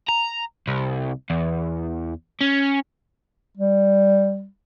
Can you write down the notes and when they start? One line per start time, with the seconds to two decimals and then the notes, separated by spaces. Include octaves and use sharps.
0.09 A#5
0.68 C2
1.30 E2
2.41 C#4
3.57 G3